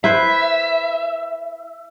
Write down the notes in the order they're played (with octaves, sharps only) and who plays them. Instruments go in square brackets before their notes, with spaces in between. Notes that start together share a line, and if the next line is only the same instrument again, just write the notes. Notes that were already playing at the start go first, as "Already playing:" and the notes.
[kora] E4 B4 C5 [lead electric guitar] E5